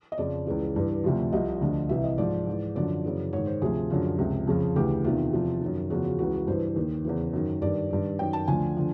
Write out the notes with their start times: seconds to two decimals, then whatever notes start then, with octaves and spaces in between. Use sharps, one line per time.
0.12 D#5
0.18 F2 C#3 F3 D5
0.47 C#2 C#3 E3
0.75 G2 E3
1.04 D2 C3 F3
1.33 C2 C3 F3 D#5
1.61 D2 D3 F3
1.89 C2 C3 E3 E5
2.04 D#5
2.18 G#2 F3 D5
2.47 G#2 E3
2.75 F#2 D3 F3 D5
3.04 F#2 C#3 E3
3.33 G#2 D#3 C#5
3.47 C5
3.62 D2 C3 F3 G#4
3.90 F#2 D3 F3
4.18 C#2 C3 F3
4.47 F2 C#3 F3
4.76 D2 C#3 E3 G4
5.04 E2 C3 D#3 F4
5.33 E2 C3 F3
5.61 F#2 D#3
5.90 E2 C#3 F3 F#4
6.05 F#4
6.19 C#2 C#3 E3 F#4
6.47 G2 E3 C5
6.76 D#2 D#3
7.05 E2 C#3 E3
7.33 F#2 D#3
7.62 G2 D#3 D5
7.90 G2 D#3
8.19 F#2 D#3 G5
8.33 A5
8.48 D2 D3 F3 G#5
8.77 D3 F3